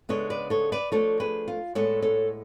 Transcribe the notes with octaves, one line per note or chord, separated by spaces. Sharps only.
C#3 G#3 B3 D4 A4 C#5
B4 D5
A4 C#5
B4 D5
F3 A3 D4 A4 C#5
G#4 B4
F4
A2 G#3 B3 D4 A4 C#5
A4 C#5